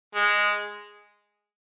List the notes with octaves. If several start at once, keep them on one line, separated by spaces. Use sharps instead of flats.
G#3